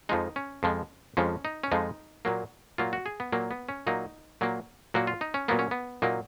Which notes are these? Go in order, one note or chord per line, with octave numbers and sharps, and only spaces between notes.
F2 F3 G#3 D#4
C#4
F2 F3 G#3
F2 F3 G#3 C#4
D#4
C#4
F2 F3 G#3 D#4
A#2 F#3 A#3
A#2 F#3 A#3 F4
F#4
G#4
B3
A#2 F#3 A#3
B3
C#4
A#2 F#3 A#3 D#4
A#2 F#3 A#3
A#2 F#3 A#3 F#4
F4
D#4
C#4
A#2 F#3 A#3 B3
C#4
B3
A#2 F#3 A#3 D#4